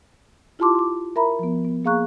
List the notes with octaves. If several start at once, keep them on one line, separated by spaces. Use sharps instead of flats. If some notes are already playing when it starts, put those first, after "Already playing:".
E4 F4 G4 A5 C6 D6
C6 D6
A#4 E5 A#5 B5
F3 B3
B3
A#3 G#4 F5 A#5 C#6 F#6